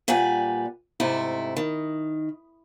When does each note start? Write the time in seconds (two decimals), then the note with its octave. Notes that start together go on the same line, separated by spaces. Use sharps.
0.08 A#2 G3 B4 F#5 G#5
1.00 G#2 C3 A3 E4
1.57 D#3